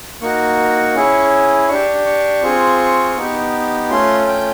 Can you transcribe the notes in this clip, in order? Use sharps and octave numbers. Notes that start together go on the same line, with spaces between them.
A#3 D#4 F#4 C#6
C#4 E4 G#4
D4 G4 C#6
C#6
C4 F4 G#4
B3 D#4 G4
A3 C#4 F4 C6
G5